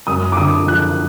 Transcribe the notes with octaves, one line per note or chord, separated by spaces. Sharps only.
F#2 D#6
D6
D3 D#6
F3 F#6